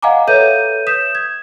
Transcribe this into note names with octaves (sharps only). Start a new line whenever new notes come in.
D#5 F5 F#5 G#5 A#5 D6
A4 B4 C#5 E5 G6 D#7
D#6 G6 B6 E7
G#6